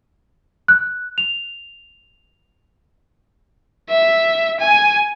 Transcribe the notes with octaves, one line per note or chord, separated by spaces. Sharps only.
F#6
F7
E5
G#5